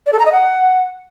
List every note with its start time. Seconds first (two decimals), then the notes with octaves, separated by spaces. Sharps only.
0.06 D5
0.13 A4
0.19 A#5
0.26 D#5
0.32 F#5